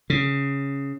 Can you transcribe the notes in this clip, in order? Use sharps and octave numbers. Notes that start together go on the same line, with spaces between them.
C#3